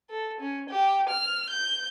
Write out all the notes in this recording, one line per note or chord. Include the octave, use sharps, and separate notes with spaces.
A4
C#4
G4
F6
G6